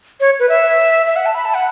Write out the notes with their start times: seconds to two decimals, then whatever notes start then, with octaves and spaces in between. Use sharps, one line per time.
0.20 C#5
0.40 B4
0.49 E5
1.06 E5
1.16 F#5
1.26 A5
1.35 B5
1.45 A5
1.54 F#5